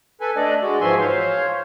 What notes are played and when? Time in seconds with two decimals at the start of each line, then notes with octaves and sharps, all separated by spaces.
0.21 A4 B4 G#5
0.36 A3 D4 D5 D#5
0.62 G#3 F#4
0.81 G#2 E3 F3 E5 G#5 C6
1.00 C5 C#5 F5